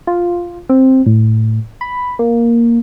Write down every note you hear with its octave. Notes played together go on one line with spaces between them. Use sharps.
F4
C4
A2
B5
A#3